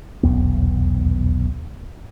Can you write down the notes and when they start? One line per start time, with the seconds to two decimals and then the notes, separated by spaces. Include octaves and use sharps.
0.23 D#1 B1 E2 B3